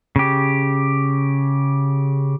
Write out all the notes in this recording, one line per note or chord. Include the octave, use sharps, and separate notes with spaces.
C#3 G4